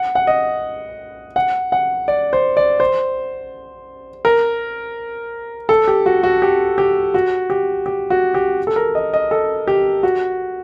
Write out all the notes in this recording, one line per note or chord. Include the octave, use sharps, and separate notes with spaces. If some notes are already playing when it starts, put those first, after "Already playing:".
Already playing: F#5
F#5
D#5
F#5
F#5
D5
C5
D5
C5
A#4
A4
G4
F#4
F#4
G4
G4
F#4
G4
G4
F#4
G4
A4
A#4
D#5
D#5
A4
G4
F#4